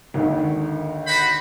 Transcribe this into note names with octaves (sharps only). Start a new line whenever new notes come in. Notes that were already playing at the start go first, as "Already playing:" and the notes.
G#1 D#2 D3
F#4 C5 B5